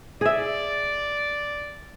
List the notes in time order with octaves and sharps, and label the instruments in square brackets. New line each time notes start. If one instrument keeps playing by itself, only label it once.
[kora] G#4 E5 [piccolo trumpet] D5